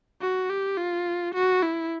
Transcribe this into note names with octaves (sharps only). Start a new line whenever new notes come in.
F#4
G4
F4
F#4
E4